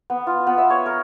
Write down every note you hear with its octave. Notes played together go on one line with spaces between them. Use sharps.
B3
F4
B3
E5
C#5
A#4